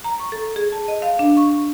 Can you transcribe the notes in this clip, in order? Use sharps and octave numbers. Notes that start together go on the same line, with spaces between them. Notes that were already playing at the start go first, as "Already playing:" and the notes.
A#5
C#6
A4
G#4
A5
D#5
F5
D4
C#6